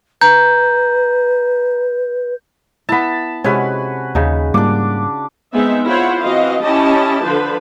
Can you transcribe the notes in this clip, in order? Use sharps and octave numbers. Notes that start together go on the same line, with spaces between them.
B4 A#5 G6
B3 E4 A5 B5
C3 G#3 C#4 F#4 B4 G#5
D#2 C#3 D#4
G#2 G3 A#3 D4 F4 D6
G#3 B3 C4 D#4 E5
E4 F4 C5 C#5 F#5
E3 C4 F#4 D#5 F5
C#4 E4 G4 D#5 A5
D3 F3 B4 C5